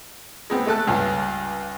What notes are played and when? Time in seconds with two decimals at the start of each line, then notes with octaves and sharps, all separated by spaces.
0.50 G#3 B3 C4
0.66 G#3 A3 A4 F#6
0.87 C#2 G2